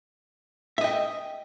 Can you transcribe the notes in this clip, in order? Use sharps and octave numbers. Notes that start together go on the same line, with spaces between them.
D#5 E5 G5